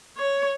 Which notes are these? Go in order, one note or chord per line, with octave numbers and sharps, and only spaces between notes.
C#5